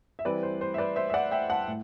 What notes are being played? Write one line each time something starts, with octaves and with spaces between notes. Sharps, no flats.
E5
E3 G3 C4 E4 B4 D5
C5
C5
E5
B4 D5
C5 E5
E5
D5 F#5
E5 G5
F#5 A5
A2